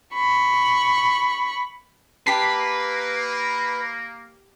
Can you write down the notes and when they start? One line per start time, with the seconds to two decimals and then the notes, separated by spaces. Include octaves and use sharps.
0.14 B5 C#6
2.27 A#3 G4 B4 A5 B6 C7